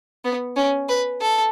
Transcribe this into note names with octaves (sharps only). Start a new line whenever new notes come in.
B3
C#4
B4
A4